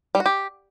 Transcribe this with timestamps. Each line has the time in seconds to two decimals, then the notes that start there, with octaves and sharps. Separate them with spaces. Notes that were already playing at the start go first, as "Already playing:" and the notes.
0.15 G3
0.20 F#4
0.26 G4